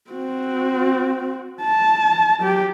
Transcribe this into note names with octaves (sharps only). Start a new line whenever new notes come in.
C4 F#4
A5
F#3 G4